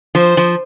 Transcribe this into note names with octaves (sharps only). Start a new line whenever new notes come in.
F3 C5
F3